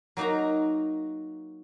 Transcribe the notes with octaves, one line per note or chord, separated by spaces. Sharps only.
F#3 A#3 D#4 F#4 A#5